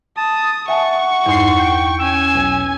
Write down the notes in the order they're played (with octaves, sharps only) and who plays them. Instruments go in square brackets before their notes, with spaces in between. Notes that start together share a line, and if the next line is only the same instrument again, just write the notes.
[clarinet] A5 [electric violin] D#6
[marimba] E5 G#5 A5 [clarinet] F#5 [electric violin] C#6
[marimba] E2 D#4 [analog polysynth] G2 C6 C7
[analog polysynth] G5
[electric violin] C#4 G#5 [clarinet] E6
[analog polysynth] B1